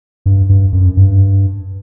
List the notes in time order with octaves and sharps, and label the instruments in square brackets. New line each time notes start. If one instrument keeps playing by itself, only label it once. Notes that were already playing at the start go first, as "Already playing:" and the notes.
[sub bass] G2
G2
F#2
G2